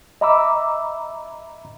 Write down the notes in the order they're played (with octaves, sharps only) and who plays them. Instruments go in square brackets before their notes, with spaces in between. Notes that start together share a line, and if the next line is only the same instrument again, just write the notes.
[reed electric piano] D#5 E5 A#5 B5 D6 E6